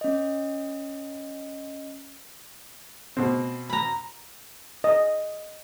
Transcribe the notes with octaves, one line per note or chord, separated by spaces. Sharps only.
C#4 D#5
B2 C4
A#5 B5
D#5